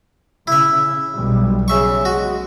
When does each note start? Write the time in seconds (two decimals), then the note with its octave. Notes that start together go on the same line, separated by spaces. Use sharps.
0.47 C#3 E4 E5
1.14 B1 B2 G3
1.68 C#3 E5 C#6
2.05 G#3 F#4